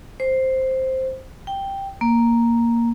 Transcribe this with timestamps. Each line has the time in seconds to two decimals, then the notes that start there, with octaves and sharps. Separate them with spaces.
0.20 C5
1.47 G5
2.01 A#3